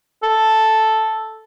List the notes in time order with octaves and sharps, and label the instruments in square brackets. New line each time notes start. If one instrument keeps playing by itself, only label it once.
[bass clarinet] A4